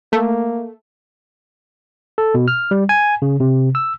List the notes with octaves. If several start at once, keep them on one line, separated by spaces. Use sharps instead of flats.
A3 A#3
A4
B2
F6
G3
G#5
C#3
C3
E6